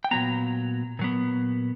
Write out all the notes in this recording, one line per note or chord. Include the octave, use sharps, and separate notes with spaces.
G5
A#2 F#3 B3 A#5
A#2 F#3 B3